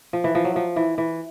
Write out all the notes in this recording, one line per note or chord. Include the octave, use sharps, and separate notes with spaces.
F3
E3
F3
F#3
F3
E3
E3